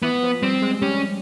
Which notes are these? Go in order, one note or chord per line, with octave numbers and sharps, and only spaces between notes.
E3 B3
F3
G3 C4
G#3
G3 C#4